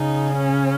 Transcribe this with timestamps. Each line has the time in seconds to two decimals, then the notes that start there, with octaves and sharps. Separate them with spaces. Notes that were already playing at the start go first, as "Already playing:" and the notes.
Already playing: C#3 D#4
0.38 C#4